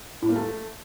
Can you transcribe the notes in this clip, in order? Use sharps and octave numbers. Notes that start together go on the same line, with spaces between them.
A2
A#3
A3